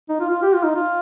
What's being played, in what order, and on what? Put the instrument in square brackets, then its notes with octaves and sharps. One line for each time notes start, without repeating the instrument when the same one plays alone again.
[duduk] D#4
F4
F4
G4
F4
D#4
F4